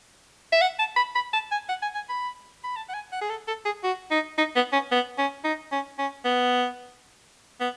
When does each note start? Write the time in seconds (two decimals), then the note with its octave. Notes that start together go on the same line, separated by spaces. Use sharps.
0.52 E5
0.61 F#5
0.79 A5
0.96 B5
1.15 B5
1.33 A5
1.51 G#5
1.69 F#5
1.82 G#5
1.95 G#5
2.09 B5
2.64 B5
2.76 A5
2.89 F#5
2.94 G#5
3.12 F#5
3.21 G#4
3.30 A4
3.47 A4
3.65 G#4
3.83 F#4
4.11 D#4
4.38 D#4
4.56 B3
4.72 C#4
4.92 B3
5.18 C#4
5.44 D#4
5.72 C#4
5.98 C#4
6.25 B3
7.60 B3